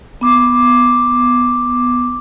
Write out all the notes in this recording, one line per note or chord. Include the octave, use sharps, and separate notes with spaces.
B3 D6